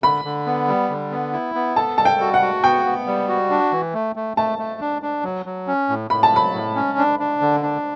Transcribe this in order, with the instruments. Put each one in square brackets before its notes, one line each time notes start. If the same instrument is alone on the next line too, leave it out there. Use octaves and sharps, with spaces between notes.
[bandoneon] D3 [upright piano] B5
[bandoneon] D3
B3
G3
D3
B3
E4
B3
[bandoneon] A4 [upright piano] A5
[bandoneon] G3 [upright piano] A5
[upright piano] G5
[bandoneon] F#4
[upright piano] F#5
[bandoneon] F#4
[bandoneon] B3 [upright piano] G5
[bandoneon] B3
G3
F#4
D4
E3
A3
A3
[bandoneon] A3 [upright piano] A5
[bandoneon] A3
D4
D4
F#3
F#3
C#4
A2
[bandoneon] A2 [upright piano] B5
[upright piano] A5
[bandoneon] F#3 [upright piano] B5
[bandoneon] A2
C#4
D4
D4
D3
D4